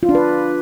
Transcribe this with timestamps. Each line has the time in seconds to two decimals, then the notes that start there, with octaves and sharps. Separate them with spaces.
0.03 F4
0.09 D4
0.15 B4